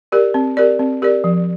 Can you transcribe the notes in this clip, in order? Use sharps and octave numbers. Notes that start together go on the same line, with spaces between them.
G4 A#4 D5
C4
G4 A#4 D5
C4
G4 A#4 D5
F3